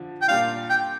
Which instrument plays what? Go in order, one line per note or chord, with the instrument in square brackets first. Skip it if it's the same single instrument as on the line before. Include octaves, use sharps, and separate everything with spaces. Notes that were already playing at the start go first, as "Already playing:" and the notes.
Already playing: [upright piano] D3 F3
[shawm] G5
[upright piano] A#2 G3 D4 F4 [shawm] F5
[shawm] G5